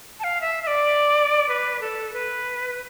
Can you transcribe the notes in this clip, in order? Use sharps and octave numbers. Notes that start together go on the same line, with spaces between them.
A5
F5
E5
E5
D5
B4
A4
B4